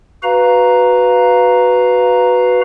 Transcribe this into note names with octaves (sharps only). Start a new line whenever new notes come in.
F#4 B4 F5 A#5